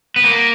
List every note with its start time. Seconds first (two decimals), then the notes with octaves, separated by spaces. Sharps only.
0.16 B3
0.24 A#3